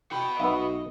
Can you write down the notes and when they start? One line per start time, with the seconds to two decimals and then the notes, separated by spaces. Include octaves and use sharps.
0.11 F#4 G5 B5
0.40 B1 B3 D#5 E5